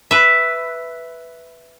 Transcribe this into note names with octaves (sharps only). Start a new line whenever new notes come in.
B4 E5